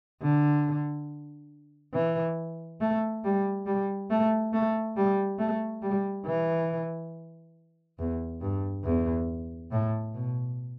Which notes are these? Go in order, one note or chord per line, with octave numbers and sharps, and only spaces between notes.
D3
E3
A3
G3
G3
A3
A3
G3
A3
G3
E3
E2
G2
E2
A2
B2